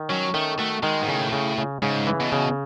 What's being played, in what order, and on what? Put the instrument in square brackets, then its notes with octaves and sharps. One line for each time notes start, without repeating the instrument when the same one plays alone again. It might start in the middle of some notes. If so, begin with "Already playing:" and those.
Already playing: [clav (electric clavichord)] D#3
[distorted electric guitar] F#3 [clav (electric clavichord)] C#4
[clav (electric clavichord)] D#3 [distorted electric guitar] A3
[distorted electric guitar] A3 [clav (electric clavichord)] F#4
[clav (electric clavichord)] D#3 [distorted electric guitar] G#3
[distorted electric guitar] G#2
[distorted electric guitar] A2 [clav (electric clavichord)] C#3
[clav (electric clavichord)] C#3
C#3
[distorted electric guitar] G#2 [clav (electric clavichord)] C#3
[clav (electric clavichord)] E3
[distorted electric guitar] B2
[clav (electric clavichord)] C#3